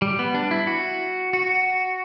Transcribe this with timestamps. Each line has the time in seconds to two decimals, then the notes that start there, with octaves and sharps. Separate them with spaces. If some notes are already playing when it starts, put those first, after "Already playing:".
0.02 G3
0.19 B3
0.35 D4
0.51 E4
0.67 F#4
1.33 F#4